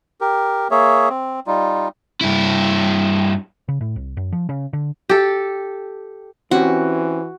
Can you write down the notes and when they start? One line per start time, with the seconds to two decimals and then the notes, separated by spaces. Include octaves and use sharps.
0.21 G4 A#4
0.71 A#3 G#4 C#5 E5
1.09 C4
1.47 G3 D#4 F4
2.21 G2 E4
3.68 C#3
3.81 A2
3.96 C2
4.17 F#2
4.32 F3
4.49 C#3
4.73 D3
5.09 G4 A4
6.51 E3 C4 C#4 F#4 G4